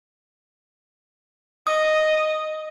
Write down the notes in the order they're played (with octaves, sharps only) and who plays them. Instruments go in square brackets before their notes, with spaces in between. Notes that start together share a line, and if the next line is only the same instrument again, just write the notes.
[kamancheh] D#5 [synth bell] D#6